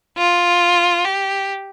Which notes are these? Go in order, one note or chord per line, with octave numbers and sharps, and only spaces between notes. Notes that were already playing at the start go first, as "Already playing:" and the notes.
F4
G4